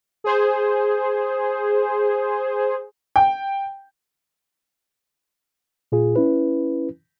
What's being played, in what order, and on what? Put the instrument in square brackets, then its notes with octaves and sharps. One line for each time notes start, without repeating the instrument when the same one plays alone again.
[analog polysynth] G#4 C5
[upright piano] G5
[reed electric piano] A#2 F4 G#4
C#4 E4 B4